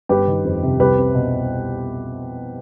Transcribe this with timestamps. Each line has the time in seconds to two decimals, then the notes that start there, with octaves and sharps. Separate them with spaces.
0.09 G1 G4 B4
0.27 D#3
0.45 F2
0.62 C3
0.80 C2 G4 B4
0.98 C4
1.14 B2